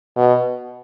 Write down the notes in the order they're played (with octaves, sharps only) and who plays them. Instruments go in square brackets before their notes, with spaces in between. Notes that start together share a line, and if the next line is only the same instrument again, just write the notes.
[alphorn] B2